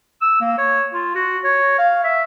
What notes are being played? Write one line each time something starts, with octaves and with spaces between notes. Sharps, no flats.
E6
A#3
C#5
F4
F#4
C#5
F5
E5